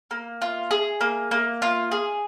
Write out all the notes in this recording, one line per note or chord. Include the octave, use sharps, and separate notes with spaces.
A#3
F4
G#4
A#3
A#3
F4
G#4